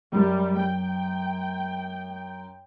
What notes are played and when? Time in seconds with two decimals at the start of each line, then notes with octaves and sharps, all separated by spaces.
0.12 F#2 G3
0.60 G5